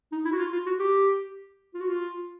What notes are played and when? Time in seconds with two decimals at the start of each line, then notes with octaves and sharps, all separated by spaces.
0.12 D#4
0.25 E4
0.32 F#4
0.39 F4
0.52 F4
0.66 F#4
0.79 G4
1.74 F4
1.81 F#4
1.88 F4